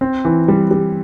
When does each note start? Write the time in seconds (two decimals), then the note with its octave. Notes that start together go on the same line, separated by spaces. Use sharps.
0.01 C4
0.25 E3
0.48 G3
0.71 G3